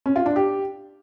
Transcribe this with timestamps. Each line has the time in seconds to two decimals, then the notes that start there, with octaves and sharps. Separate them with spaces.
0.06 C#4
0.16 F4
0.26 D4
0.36 G4